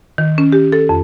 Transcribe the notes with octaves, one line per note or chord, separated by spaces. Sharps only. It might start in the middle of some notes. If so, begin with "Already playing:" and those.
D#3
C#4
G4
A4
F2